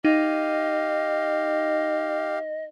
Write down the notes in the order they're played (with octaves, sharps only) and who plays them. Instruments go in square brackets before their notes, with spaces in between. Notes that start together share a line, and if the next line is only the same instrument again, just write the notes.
[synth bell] D#4 [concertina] G4 F5 [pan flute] D#5